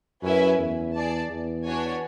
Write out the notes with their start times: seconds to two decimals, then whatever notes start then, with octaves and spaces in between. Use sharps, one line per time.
0.23 F#2 C#4 E4 B4 E5 G#5
0.59 E2
0.94 G#4 D5 A5
1.30 E2
1.66 B3 D4 F#4 C#5 G#5